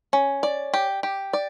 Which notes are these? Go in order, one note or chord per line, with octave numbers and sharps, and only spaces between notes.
C#4
D5
G4
G4
D5